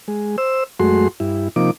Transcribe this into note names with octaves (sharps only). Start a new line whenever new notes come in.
G#3
C5 E6
F#2 G#3 A3 F#4 C6
G2 E4
C3 F3 A#3 D#4 D6